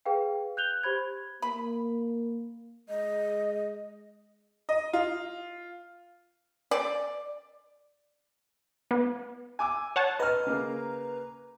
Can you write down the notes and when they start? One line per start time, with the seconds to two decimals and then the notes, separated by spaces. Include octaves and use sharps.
0.05 G#4 B4 F5 G5
0.57 F#6 G6 F7 G7
0.83 G4 C5 B5 G#6
1.42 A#3 B5
2.89 G#3 D#5
4.69 D#5
4.93 F4
6.71 D5
8.91 B3
9.59 G#5 D6 E6
9.96 C#5 F#5 A5
10.19 B4 D#5 A#5 F6
10.47 C#3 A#3